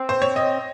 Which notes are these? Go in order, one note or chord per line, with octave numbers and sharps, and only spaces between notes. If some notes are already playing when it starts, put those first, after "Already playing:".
Already playing: C4
C5
C#5
D#5